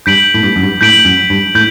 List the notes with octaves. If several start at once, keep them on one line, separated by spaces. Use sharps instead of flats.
G2 G6 B6 D7 F#7
A2
G2
F#2
G2
A2 G6 B6 D7 F#7
F#2
G2
A2 G6